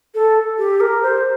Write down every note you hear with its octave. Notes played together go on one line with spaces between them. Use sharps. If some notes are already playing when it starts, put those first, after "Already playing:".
A4
G4
A#4
C5